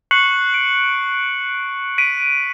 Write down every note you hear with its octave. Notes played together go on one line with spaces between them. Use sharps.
C#6 F#6 C7 C#7 F#7
D7
B6 D7 D#7